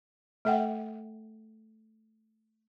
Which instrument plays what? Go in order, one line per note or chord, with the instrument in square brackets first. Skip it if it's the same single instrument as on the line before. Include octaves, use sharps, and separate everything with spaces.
[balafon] A3 A4 E5 F#5 G5